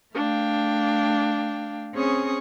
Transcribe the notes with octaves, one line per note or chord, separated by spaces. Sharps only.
A3 D4 F5 G5
C4 C#4 G#4 C#6 D#6